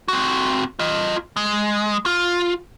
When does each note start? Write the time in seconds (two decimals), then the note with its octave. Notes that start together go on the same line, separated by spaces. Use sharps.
0.08 C4 F#4
0.79 F4 D#5
1.36 G#3
2.06 F4